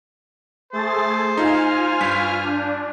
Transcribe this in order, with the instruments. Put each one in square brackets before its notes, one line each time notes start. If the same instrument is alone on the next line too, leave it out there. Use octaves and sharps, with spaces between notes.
[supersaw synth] A3 G#4 A6 [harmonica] C5
[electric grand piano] D#4 [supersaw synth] F4 G#5 F6
[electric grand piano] G2 B6
[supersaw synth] D4